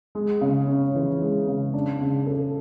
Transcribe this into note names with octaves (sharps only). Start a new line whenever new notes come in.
G#3
C#3
C#4
E3
G#3
C#3
D4
C#3
A4